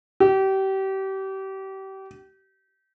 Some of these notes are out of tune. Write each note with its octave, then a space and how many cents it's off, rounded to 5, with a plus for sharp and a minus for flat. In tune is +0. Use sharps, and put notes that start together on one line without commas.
G4 -30